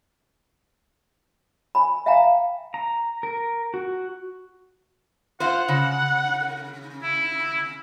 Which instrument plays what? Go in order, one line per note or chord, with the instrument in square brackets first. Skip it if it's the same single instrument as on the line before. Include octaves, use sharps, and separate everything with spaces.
[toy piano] G#5 B5
E5 F5 G5 G#5 A#5
[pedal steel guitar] A#5
A#4
F#4
[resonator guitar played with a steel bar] F4 C5 [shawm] F#5
[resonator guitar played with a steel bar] C#3
[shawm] E4